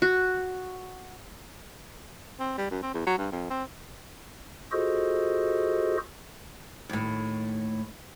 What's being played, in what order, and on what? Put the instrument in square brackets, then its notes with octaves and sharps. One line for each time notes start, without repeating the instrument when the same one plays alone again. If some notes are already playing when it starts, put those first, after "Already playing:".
[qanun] F#4
[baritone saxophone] C4
G3
F#2
C4
E2
F#3
G2
F2
C4
[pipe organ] F4 F#4 G#4 A4 C5 D#5
[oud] D#2 A2